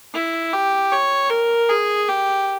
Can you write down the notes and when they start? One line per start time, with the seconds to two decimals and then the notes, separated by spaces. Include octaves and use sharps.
0.14 E4
0.53 G4
0.92 C#5
1.30 A#4
1.69 G#4
2.08 G4